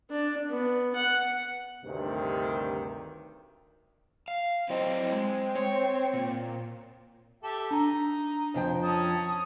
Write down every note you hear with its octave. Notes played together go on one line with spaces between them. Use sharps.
D4
B3
F#5
D2 G2 C3 D#3
F5
F#3 C4 E4 D#5
G#3
C#5
A#2
G4 A4 E5
D4 D#4 A#5
F2 F3 G5
C#4 A5 D#6